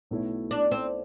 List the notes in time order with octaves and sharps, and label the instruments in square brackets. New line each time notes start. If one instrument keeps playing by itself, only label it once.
[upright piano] B1 B2 A3 E4
[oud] D4
C4